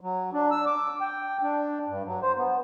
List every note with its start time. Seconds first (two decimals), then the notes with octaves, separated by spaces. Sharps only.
0.01 F#3
0.33 D4
0.51 E6
0.67 D6
1.01 G5
1.43 D4
1.87 G2
2.05 F#3
2.22 C5
2.37 B3